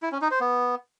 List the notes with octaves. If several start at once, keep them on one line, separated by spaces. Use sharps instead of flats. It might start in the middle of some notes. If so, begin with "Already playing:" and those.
E4
C#4
D#4
C5
B3